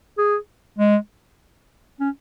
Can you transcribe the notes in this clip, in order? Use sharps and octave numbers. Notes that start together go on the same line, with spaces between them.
G#4
G#3
C#4